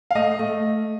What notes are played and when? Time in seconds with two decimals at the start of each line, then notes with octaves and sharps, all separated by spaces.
0.11 F5
0.15 A3 D#5
0.39 A3